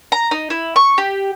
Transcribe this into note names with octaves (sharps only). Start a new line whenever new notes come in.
A#5
D#4
E4
C#6
G4